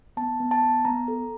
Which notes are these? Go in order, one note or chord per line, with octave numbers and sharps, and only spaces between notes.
B3 A5
B3
A5
B3
B3 A#5
A4